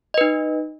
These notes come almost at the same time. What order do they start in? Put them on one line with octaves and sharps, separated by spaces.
D#5 B4 D#4